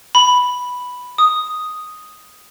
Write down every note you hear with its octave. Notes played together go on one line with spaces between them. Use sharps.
B5
D#6